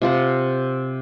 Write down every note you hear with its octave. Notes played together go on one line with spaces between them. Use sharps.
C3 F4 C5 F#5